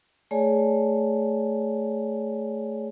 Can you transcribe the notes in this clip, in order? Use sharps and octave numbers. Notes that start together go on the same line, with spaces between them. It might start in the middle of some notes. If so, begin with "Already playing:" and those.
A3 G#4 C#5 D5 G#5